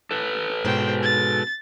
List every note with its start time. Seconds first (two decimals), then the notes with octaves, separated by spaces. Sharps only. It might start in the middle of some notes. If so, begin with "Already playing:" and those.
0.11 A4 B4
0.65 G#2 B2 C5 G5
1.02 A6